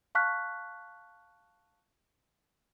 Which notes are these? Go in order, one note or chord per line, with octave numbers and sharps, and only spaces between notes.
F5 A5 C#6 F6 F#6 B6